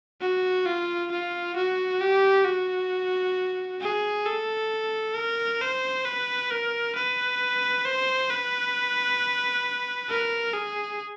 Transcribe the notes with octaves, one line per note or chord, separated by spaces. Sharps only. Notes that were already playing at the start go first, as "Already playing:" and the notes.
F#4
F4
F4
F#4
G4
F#4
G#4
A4
A#4
C5
B4
A#4
B4
C5
B4
A#4
G#4